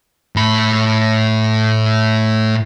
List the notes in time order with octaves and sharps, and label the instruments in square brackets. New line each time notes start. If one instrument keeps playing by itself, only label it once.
[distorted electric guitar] A2 B5